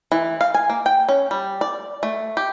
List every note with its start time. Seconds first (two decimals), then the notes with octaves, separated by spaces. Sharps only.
0.12 E3
0.41 F5
0.54 G#5
0.70 A#3
0.86 G5
1.08 C#4
1.31 G3
1.61 D5
2.03 A3
2.37 G4